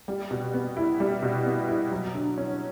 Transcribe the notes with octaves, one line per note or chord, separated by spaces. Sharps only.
G3
B2
B3
E4
G3
B2
B3
E4
F#3
D3
C#4